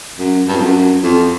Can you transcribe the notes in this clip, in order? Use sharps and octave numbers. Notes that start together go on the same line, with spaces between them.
F#2
G2
F2
F#2
F2